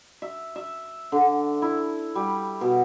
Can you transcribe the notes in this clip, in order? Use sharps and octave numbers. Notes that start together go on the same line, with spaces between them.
E5
E5
D3
E4
G3
B2